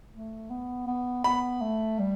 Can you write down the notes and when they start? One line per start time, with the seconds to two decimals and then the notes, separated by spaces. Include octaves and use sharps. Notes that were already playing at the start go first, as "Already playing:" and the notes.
0.13 A3
0.50 B3
0.87 B3
1.24 B3 B5
1.62 A3
1.99 G3